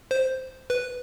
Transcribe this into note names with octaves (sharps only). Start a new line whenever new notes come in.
C5
B4